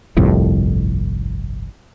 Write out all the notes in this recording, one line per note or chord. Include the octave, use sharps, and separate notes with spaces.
G1 C2 F2 A2